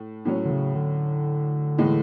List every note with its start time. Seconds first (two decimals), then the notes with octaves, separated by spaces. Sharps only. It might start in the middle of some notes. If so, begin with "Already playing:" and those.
Already playing: A2
0.25 A2 F#3 C#4
0.45 D3
0.50 C#3
0.76 D3
1.78 A2 E3 G#3